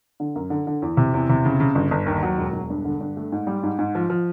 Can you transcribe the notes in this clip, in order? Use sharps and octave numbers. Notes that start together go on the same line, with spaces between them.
D3
F#2
D3
D3
E2
C3
E2
C3
C#3
C#3
G1
G1
D#2
F#3
E1
E1
G2
D3
G2
A3
G#2
G3
G#2
G#2
F3
F3